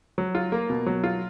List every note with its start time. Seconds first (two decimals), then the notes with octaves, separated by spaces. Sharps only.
0.18 F#3
0.35 F4
0.52 A#3
0.70 B2
0.86 F#3
1.04 F4